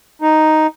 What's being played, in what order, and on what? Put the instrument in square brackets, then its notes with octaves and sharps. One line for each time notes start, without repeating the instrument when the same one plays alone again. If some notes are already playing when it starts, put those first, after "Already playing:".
[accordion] D#4